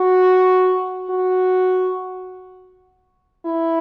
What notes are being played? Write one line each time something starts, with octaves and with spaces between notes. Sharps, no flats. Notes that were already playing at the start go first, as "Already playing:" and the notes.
Already playing: F#4
F#4
E4